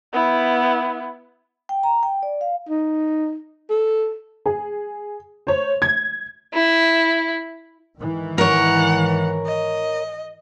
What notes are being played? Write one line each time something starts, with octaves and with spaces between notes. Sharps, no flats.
B3 E4
G5
A#5
G5
D5
F5
D#4
A4
G#4
C5 C#5
G#6
E4
G#2 D#3 E3
A#4 C#5 F#5
D#5